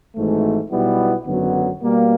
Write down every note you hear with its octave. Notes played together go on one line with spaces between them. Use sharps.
G#1 G#2 E3 A3
B1 B2 G3 B3 E4
G#1 F#2 D3 F#3 B3
B2 G3 A#3